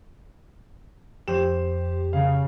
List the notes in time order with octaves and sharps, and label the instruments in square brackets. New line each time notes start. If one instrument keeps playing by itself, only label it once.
[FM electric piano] F2 G4 [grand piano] C5 E7
[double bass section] C#3 [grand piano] F5